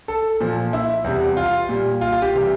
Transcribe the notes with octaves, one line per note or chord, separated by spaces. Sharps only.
A4
A#2 F3
E4
E2 C3 G3
F4
A#2 G3
F4
F4
G4
C3 E3 G3